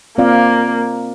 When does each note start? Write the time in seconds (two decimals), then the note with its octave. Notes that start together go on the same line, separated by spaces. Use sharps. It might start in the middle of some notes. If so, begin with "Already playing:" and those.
0.18 A#3 C4 F4 D5 F5